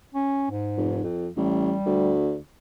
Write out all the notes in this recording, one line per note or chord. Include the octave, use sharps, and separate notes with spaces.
C#4
G#2
F1
F2
A1 G3
D2